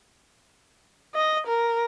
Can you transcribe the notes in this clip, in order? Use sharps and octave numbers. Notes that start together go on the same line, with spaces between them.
D#5
A#4